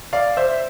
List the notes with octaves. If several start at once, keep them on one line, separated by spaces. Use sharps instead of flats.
D5 F5
C5 E5